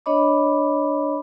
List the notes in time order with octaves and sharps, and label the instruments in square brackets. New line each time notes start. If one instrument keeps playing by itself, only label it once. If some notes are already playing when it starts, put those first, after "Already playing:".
[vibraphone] D4 C#5 D#5 B5 D6